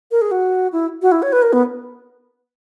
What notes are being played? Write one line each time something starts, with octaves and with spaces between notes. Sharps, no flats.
A#4
G#4
F#4
E4
F#4
E4
C#5
B4
A#4
B3